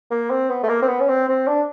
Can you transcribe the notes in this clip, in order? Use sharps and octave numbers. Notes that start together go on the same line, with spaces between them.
A#3
C4
B3
A3
A#3
C4
B3
C#4
C4
C4
D4